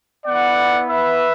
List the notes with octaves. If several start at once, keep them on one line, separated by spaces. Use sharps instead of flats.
B3 E4 D5 F#5
B4 E5